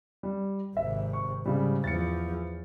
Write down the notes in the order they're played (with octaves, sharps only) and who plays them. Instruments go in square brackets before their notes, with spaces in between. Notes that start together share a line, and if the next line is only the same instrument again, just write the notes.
[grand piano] G3
[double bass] G#1 C3 [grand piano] E5
[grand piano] C#6
[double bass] G#2 [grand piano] C#3 G3
[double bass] E2 F3 [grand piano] A6 C#7